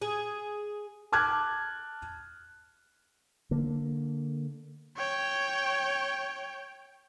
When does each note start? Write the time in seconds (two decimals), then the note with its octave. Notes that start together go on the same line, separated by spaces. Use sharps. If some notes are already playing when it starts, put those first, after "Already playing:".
0.02 G#4
1.12 A5 D6 F6 F#6 G#6
3.51 D3 A#3
4.97 C#5 G5